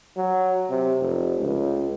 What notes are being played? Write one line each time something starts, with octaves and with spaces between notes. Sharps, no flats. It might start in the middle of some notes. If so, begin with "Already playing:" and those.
F#3
C3
F1
C#2